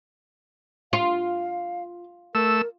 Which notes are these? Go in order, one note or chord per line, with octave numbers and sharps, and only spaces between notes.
F4 F5
A3 A#4 E6